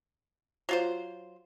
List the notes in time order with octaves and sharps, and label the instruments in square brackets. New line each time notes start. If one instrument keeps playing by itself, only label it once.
[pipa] F#3 F4 C5